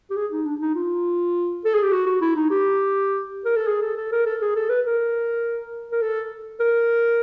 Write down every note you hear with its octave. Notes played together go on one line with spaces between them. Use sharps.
G4
G#4
D#4
D4
D#4
F4
A4
G#4
G4
F#4
F#4
E4
D#4
G4
A#4
A4
G#4
A4
A4
A#4
A4
G#4
A4
B4
A#4
A#4
A4
A#4